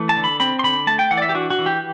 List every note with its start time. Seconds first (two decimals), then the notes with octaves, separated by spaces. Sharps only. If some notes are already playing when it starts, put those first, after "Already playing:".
Already playing: E3 A3
0.09 A5
0.17 D3
0.24 B5
0.40 C4 B5
0.59 C6
0.63 D3 B5
0.87 A3 A5
0.99 G5
1.11 E3 F#5
1.17 D5
1.22 E5
1.29 G4
1.34 D4 F#4
1.50 F#4
1.59 E3
1.66 G4